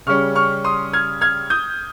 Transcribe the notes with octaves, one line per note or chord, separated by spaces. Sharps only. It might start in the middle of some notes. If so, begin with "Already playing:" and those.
C#3 G3 C#4 C#6 F6
C#6 F6
C6 D#6
F6 G#6
F6 G#6
D#6 G6